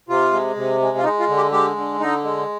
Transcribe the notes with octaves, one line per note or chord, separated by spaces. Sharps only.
C3 F4
G#3
C3
G#3
F4
G#3 D#4
F4
D3
G4
G#3 G4
D3
D3 D#4
G#3